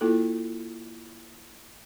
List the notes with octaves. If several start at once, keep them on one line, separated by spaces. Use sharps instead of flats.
A#3 E4 F4 A4